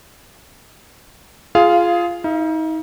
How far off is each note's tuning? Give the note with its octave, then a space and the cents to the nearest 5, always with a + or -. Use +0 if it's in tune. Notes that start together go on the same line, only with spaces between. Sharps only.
F4 -15 G#4 +10 F5 +0
D#4 +35 F5 -35